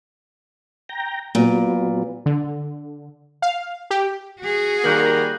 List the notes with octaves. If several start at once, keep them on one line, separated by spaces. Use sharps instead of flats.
G5 A#5
A#2 F#3 B3
D3
F5
G4
F#4 G#4
D#3 G3 A#3 A#4 F#6 G6 F#7